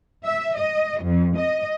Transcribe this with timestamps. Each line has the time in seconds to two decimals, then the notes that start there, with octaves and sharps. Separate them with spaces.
0.24 E5
0.56 D#5
1.03 F2
1.37 D#5